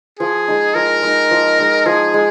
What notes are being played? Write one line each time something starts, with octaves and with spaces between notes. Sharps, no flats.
F3 G#4
G#3 D#4
F3 A#4
G#3 D#4
F3
G#3 D#4
F3 G#4
G#3